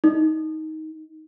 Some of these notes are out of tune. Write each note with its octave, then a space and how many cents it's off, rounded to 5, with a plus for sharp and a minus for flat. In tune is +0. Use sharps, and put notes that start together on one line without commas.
D#4 +15